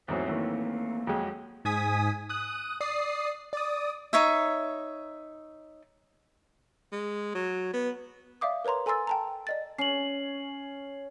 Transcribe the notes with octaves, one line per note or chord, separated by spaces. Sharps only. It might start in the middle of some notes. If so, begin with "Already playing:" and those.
E2 G#2 F#3 A3 C4 C#4 C5
D#3 E3 F#3 A#3
F2 F#3 G#3 F#4 G5
G#2 G#5 D#6 B6
D#6 F#6
D5 D#6 C7
D5 D#6
D#4 C#5 E5
G#3
F#3
B3
D5 E5 F5 D6 D#6
A#4 B4 C#5 A#5 C6
A4 G#5 A#5 C6 E6 A6
G5 A5 A#5
D5 D#5 A6
C#4 C7 F#7